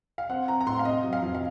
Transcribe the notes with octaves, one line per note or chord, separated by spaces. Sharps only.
F5
C4 F#5
C4 A#5
A#5
A2 C6
F5
C3 D#5
F#3
F5
F2
F5